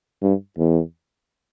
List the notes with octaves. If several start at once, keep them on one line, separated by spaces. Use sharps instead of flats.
G2
E2